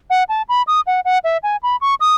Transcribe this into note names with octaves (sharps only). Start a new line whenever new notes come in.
F#5
A5
B5
D#6
F#5
F#5
E5
G#5
B5
C#6
D#6